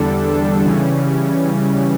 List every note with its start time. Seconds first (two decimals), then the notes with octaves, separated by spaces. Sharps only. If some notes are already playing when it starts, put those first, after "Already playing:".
Already playing: E2 D3 G3 D4 A4
0.65 C#3 E3 G3 C#4